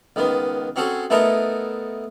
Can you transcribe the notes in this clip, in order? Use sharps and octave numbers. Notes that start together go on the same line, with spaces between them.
C#2 D#3 B3
C4 C#4 F#4 G#4 A4
A3 B3 D#4 E4 A4 A#4